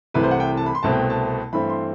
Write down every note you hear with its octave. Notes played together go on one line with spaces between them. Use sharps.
C2 C3 E3 A3 B4
C5
F#5
G5
A5
B5
C6
C2 B2 A3 C4 A5
G5
A5
G2 E3 A3 C4 B5
C6